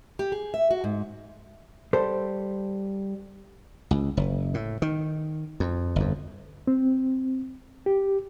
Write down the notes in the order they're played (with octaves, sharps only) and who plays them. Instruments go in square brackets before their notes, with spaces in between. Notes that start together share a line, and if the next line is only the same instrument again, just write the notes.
[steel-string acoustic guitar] G4
G#4
E5
F#4
G#2
[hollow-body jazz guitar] G3 A4 C5
[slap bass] C#2
F#1
A2
D#3
F2
G1 F2
[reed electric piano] C4
G4